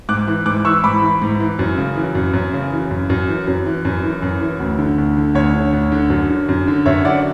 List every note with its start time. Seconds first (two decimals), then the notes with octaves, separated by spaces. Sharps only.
0.09 G#2 D6 F#6
0.27 E3
0.46 G#2 D6 F#6
0.65 E3 C#6 E6
0.84 G#2 B5 D6
1.02 E3
1.22 G#2
1.40 E3
1.59 F#2
1.78 C#3
1.96 E3
2.15 F#2
2.34 F#2
2.53 C#3
2.72 E3
2.91 F#2
3.10 F#2
3.28 E3
3.47 F#2
3.66 E3
3.85 F#2
4.03 E3
4.22 F#2
4.41 E3
4.60 D2
4.79 D3
4.98 D2
5.17 D3
5.35 D2 C#5
5.54 D3
5.73 D2
5.92 D3
6.10 F#2
6.30 D3
6.49 F#2
6.68 D3
6.86 F#2 C#5 E5
7.04 D3 D5 F#5